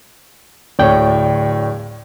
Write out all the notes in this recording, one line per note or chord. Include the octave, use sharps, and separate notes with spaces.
D1 D2 A2 C#5 D5 G5